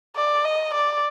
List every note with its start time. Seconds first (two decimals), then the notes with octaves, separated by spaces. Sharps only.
0.16 D5
0.45 D#5
0.74 D5